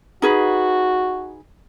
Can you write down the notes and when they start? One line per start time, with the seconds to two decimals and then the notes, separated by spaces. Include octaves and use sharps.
0.22 D#4 F#4 G#4 B4